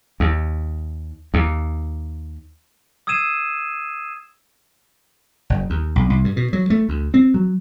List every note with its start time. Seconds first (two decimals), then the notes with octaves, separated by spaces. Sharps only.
0.20 D#2
1.34 D#2
3.07 D#6 E6 G#6 C7 D#7 E7
5.50 F#1
5.70 D#2
5.96 B1
6.10 C2
6.24 G2
6.36 B2
6.53 F#3
6.70 A3
6.89 D2
7.14 C4
7.34 F#3